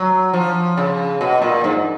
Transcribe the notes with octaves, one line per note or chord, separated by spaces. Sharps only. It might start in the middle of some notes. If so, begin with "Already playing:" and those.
Already playing: F#3
F3
C#3
B2
A#2
G#2